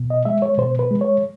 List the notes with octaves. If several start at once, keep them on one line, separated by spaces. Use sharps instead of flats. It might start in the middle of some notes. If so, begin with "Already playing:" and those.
Already playing: B2
D#5
G#3 E5
C#5
B2 C5
B4
G#3
C#5